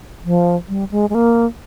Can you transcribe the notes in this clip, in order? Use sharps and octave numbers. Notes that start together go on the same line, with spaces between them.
F3
G3
G#3
G#3
A#3